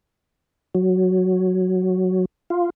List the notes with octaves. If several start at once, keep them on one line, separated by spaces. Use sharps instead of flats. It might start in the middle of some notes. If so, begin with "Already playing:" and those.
F#3
F4